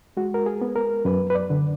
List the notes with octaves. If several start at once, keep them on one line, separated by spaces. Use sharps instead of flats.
G#3 F#4
A#4
G#4
B3
A#4
F#2 B4
B4
D5
D3